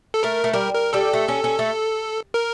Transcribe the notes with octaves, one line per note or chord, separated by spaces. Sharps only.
A4
A3 A#4
A3
G3 A#4
A#4
G3 A4
A3
C#4
C#4
A3
A#4